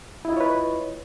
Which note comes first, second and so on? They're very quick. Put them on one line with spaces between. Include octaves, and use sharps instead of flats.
E4 D#5 F4 C#5 B4